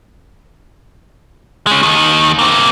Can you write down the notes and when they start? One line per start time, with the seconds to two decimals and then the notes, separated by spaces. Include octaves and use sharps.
1.67 G#3 C#4
1.83 D#2 D#3
2.39 A#3 C4